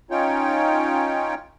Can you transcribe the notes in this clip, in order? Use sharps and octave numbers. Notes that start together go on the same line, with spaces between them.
C#4 D#4 F4 C#5 G5